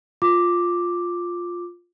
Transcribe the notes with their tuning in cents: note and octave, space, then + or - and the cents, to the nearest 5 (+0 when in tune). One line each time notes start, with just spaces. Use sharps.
F4 +5 D6 +0